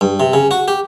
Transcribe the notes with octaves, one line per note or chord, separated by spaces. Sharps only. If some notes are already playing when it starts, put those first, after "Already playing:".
G2
C3
C#3
F#4
G4